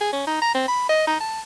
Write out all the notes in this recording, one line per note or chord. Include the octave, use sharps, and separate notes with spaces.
G#4
C#4
D#4
A#5
C4
B5
D#5
D#4
A5